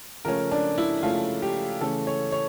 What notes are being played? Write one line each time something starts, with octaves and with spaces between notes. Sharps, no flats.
C#3 F3 A3 C#4 A#4
D4
E4
C#3 F3 A3 C#4 F4
G4
C#3 E3 A3 C#4 A4
C#5
C#5